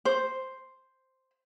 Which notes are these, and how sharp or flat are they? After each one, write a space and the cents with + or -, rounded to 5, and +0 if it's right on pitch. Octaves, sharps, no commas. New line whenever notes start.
C5 +0